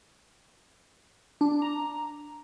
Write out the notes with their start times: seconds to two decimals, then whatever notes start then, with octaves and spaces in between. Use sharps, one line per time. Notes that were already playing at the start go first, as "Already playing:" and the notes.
1.41 D4
1.62 A#5